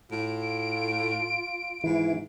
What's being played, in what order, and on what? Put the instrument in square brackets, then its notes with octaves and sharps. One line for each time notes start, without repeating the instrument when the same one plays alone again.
[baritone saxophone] A2 [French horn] F4 [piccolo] D7
[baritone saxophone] G#2 [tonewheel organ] E3 E4